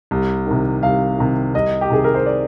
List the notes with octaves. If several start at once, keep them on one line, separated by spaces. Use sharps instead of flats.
C2
C3 D#3
C2 F5
C3 D#3
C2 D#5
G4
C3 D#3 G#4
A#4
C5
D5